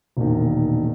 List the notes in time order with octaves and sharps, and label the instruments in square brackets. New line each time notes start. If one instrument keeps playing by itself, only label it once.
[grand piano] E1 A#1 D#3